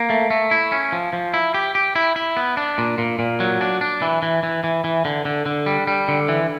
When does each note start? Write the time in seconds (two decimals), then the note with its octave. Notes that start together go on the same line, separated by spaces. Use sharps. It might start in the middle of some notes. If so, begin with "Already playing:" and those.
Already playing: A#3
0.10 A3
0.30 A3
0.51 E4
0.72 C#4
0.92 F3
1.13 F3
1.34 E4
1.54 G4
1.75 G4
1.96 E4
2.16 E4
2.37 B3
2.57 D4
2.78 A#2
2.98 A#2
3.19 A#2
3.40 F#3
3.61 D4
3.81 D4
4.02 E3
4.23 E3
4.43 E3
4.64 E3
4.84 E3
5.05 D3
5.25 D3
5.46 D3
5.66 G3
5.87 G3
6.08 D3
6.28 E3